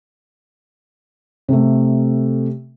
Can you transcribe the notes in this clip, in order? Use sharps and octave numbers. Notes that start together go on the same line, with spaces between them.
C3 A3